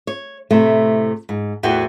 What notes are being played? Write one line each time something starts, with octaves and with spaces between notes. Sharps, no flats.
C#5
A2 C3 A3
G#2
E2 A2 E3 F#4 G5